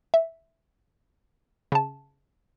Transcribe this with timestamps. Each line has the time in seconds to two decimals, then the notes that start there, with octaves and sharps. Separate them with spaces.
0.14 E5
1.72 C#3 A5